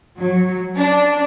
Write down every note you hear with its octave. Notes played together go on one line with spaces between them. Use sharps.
F#3
D4